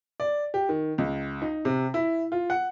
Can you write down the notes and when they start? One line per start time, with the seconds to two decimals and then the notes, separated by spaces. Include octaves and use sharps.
0.20 D5
0.54 G4
0.69 D#3
0.98 C#2
1.42 D#4
1.65 C3
1.94 E4
2.32 F4
2.50 F#5